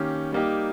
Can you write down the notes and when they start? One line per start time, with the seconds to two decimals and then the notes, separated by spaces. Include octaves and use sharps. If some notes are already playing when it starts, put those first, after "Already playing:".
Already playing: D#3 A#3 C#4 G4
0.33 G3 A#3 D#4 G4